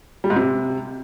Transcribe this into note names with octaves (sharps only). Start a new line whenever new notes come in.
G3
G#2
C3